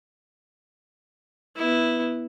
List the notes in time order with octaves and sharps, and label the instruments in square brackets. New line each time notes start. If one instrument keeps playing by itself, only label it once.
[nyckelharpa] B3 E4